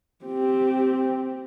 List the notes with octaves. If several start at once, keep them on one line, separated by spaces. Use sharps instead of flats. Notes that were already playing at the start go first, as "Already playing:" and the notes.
C4 G4